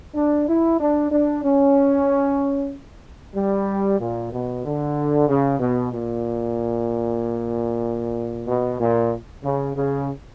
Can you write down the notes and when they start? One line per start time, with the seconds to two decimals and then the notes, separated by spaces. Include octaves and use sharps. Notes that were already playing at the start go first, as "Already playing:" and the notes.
0.15 D4
0.48 E4
0.80 D4
1.11 D4
1.43 C#4
3.35 G3
4.00 A#2
4.32 B2
4.64 D3
5.28 C#3
5.59 B2
5.92 A#2
8.47 B2
8.80 A#2
9.44 C#3
9.76 C#3